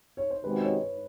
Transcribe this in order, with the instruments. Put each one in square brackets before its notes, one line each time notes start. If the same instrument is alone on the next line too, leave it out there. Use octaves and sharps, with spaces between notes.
[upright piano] C#5
C5
[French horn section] C3 D#3 G#3 C#4 F#4 [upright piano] B4
[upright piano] C#5